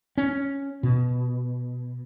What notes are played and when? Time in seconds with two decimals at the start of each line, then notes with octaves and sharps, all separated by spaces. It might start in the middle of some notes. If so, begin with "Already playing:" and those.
0.18 C#4
0.83 B2